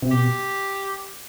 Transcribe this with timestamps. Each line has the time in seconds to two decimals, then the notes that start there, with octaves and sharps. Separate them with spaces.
0.02 C3
0.11 B2 G4